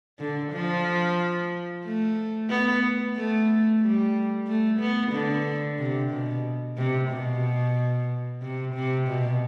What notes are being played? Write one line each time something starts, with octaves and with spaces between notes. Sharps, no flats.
D3
F3
A3
B3
A3
G3
A3
B3
D3
C3
B2
C3
B2
C3
C3
B2